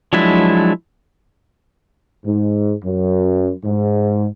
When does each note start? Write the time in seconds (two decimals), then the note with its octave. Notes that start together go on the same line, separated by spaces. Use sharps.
0.13 F3 F#3 G#3 D4 E4
2.26 G#2
2.84 F#2
3.64 G#2